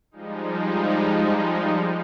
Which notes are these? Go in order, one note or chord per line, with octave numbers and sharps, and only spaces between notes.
F3 G3 G#3 D#4